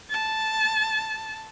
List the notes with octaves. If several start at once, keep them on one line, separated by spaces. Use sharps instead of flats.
A5